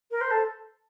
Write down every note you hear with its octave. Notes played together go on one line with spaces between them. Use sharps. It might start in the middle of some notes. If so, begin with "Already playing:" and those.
A#4
C5
A4